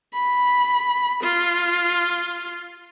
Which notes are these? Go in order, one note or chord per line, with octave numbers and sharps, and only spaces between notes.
B5
F4